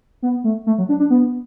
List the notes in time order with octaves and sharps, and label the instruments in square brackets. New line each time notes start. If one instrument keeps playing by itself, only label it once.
[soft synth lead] B3
A3
A3
F#3
D4
D4
B3